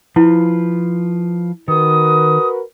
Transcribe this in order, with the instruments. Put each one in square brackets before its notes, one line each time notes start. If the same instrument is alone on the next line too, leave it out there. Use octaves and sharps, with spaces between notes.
[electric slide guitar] F3 F4 B4 [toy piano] E4
[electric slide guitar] D#3 [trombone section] F#4 A#4 B4 [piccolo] D#6